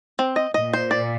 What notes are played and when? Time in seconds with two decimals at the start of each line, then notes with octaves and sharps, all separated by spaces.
0.19 C4
0.36 D#5
0.54 A#2 D#5
0.73 C5
0.91 D5